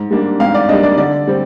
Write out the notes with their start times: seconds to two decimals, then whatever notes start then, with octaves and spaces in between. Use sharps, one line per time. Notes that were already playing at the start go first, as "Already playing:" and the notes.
Already playing: G#2
0.11 G3 A#3 D4
0.40 G#2 F5
0.54 D5
0.69 G3 A#3 D4 D#5
0.83 D5
0.97 D3 D5
1.27 G3 C4